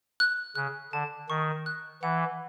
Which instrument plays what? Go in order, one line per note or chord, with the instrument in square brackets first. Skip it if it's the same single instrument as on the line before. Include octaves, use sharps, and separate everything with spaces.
[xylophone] F#6
[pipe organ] C#3 [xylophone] F#6
[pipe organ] D3 [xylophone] A5
[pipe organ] D#3 [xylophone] C#6
[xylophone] F#6
[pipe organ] E3 [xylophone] F#5